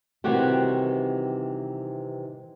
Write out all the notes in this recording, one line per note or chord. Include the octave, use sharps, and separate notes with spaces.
C3 D#3 E3 G3 F#4 G4